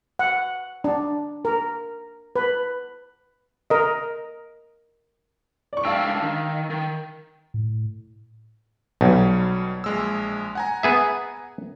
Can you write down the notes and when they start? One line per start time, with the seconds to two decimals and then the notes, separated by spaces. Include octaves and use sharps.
0.19 F#5
0.84 D4
1.45 A#4
2.36 B4
3.70 A#4 D#5
5.73 D5 C#6
5.85 G#3 D4 F5 G5 E6
6.22 D#3
6.70 D#3
7.54 A2
9.01 B1 B2 F#3 G3
9.84 A#1 G#3 E6
10.55 F#5 G#5 A#5
10.83 B3 G#4 E5